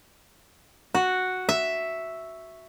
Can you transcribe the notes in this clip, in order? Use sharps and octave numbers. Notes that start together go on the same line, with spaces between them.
F#4
E5